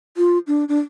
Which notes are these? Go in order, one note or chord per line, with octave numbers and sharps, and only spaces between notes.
F4
D4
D4